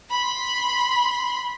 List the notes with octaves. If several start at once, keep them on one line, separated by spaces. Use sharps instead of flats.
B5 C6